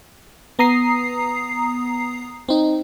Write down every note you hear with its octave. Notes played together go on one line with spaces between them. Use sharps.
B3 A#5 D#6 C7
C4 D#4